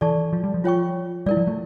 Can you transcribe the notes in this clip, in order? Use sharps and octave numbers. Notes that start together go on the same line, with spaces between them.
E3 A4 D5 A5 C#6
F3
G3
F3
F4 C#5 G5 C#6
G3 E4 A#4 D5
F3
A3